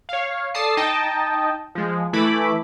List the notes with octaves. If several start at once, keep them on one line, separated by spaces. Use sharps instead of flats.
C#5 F5
A4 D5 A5 D#6 C7
D#4 D#5 G5 A5
F3 G#3
E3 A3 E4 B5 D6